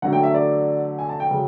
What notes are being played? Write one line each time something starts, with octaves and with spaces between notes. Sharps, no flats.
D3 F#3 A3 F#5
G5
E5
D5
G#5
A5
G5
C#3 F#3